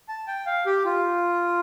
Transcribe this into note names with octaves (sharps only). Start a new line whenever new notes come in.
A5
G5
F5
G4
F4